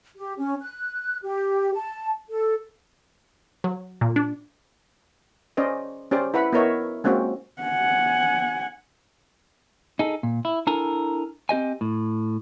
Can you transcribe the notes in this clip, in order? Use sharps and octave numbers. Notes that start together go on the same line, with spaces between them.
G4
C#4
F#6
G4
A5
A4
F#3
A#2
D4
C#4 C5 D5 D#5
C#4 G4 C5 D5
E4 B4 F#5 B5
B3 E4 A#4 C#5 D#5 E5
G#3 A#3 C4 C#4 F#4
F#5 G#5
D#4 G#4 A4
A#2
E4
D4 E4 A4 A#4 G#5 A#5
C4 G4 D#5 G#5
A2